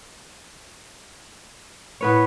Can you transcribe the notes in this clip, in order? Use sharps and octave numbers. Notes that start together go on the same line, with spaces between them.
A2 B3 B4 C#5